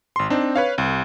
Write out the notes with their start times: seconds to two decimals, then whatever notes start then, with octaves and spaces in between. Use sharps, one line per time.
0.16 G#1 C6
0.30 C4 D4 D#4
0.56 B4 C#5 F5
0.78 C2